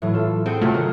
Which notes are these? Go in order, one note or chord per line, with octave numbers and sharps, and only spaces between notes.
A2 E3 F#3
F4 A4
C4 G#4 F#5 G5
C3 F#3 A3 F4
D#3 F#3 A#3 A#4